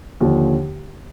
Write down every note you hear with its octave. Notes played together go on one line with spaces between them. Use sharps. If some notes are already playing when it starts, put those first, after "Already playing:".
D#2 D3 F3